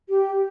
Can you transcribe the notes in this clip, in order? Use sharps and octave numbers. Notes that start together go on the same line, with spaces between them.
G4